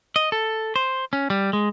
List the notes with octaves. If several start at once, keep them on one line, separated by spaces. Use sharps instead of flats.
D#5
A4
C5
C#4
G3
G#3